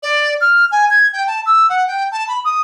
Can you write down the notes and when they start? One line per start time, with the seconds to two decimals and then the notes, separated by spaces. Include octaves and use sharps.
0.03 D5
0.41 F6
0.71 G#5
0.91 G#6
1.13 G5
1.27 A5
1.46 E6
1.69 F#5
1.87 G5
2.12 A5
2.28 B5
2.45 D#6